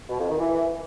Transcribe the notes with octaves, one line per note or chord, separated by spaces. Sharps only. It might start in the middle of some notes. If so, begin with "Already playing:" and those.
B2
F2
D#3
E3